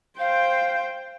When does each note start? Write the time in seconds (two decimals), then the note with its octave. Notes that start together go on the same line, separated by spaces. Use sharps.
0.19 C5 F5 G5